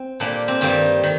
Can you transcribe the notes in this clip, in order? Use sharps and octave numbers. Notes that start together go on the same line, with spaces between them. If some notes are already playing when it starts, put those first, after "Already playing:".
Already playing: C4
A#2 G3 A#3 D4
C4
G2 D#3 G3 A#3 C4
D#3